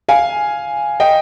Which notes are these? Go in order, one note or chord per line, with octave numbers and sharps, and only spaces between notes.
F5 G#5
D#5 G5